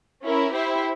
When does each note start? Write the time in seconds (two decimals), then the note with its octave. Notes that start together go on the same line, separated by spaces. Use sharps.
0.23 C#4 E4 A#4 E5
0.52 E4 G4 C5 E5